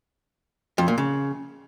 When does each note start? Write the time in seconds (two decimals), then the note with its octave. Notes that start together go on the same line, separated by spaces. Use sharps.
0.78 F2
0.88 A#2
0.98 C#3